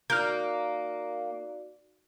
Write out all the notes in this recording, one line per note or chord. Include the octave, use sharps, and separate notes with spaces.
A#3 D#4 F#4 D5 F6 G6